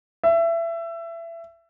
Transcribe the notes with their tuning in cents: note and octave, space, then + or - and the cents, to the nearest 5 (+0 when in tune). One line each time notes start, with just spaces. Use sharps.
E5 +25